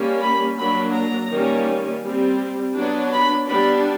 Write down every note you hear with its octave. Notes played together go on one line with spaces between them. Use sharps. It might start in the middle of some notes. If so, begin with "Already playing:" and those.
Already playing: G3 A#3 C#4
B5
F#3 A#3 D4 B5
A#5
D#3 G3 A#3 C#4
G3 C4
F#3 B3 D4
B5
G3 B3 D4 B5